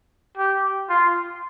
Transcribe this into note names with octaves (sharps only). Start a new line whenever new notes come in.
G4
F4